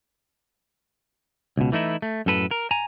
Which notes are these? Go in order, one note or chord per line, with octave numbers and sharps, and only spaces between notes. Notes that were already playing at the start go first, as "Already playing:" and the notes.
C#2 B2
E3 A3 D#4 E4
A3
F#2 A2 A4 B4
A#4
G#5 A#5